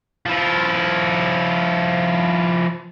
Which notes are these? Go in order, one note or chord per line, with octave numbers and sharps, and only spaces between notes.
F3 E4